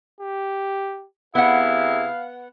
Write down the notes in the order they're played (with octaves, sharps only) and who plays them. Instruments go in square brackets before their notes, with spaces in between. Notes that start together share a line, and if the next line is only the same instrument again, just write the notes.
[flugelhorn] G4
[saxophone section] C3 E4 G#4 [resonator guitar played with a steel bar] B3 F#5 [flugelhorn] F5